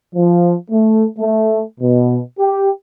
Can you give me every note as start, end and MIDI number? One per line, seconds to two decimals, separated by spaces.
0.15 0.53 53
0.71 1.04 57
1.19 1.62 57
1.80 2.19 47
2.39 2.68 67